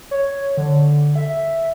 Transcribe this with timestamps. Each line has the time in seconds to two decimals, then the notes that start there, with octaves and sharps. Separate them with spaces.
0.11 C#5
0.57 D3
1.16 E5